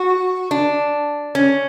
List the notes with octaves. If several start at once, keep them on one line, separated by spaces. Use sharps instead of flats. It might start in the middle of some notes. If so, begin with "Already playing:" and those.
Already playing: F#4
D4
C#4